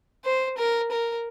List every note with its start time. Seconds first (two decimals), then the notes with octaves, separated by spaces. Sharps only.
0.24 C5
0.57 A#4
0.91 A#4